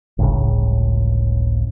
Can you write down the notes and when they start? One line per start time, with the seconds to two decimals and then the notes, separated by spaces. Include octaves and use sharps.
0.18 G1 C#2 A2 C#3